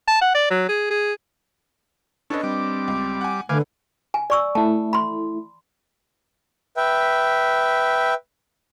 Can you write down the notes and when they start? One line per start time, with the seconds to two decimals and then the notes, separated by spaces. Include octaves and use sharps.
0.08 A5
0.21 F#5
0.35 D5
0.50 F#3
0.69 G#4
0.90 G#4
2.30 C#4 D4 A4 B4 D#5
2.44 G3 C4 D6
2.88 C#2
3.21 F#5 G#5
3.49 D3 A3 B4 F5 G#5 D6
4.14 G#5
4.30 D5 C#6 E6
4.55 A3 E4 A5
4.93 B5 C6
6.77 B4 E5 G5